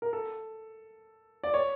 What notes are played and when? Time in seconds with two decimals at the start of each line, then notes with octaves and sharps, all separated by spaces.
0.02 A#4
0.13 A4
1.43 D5
1.54 C#5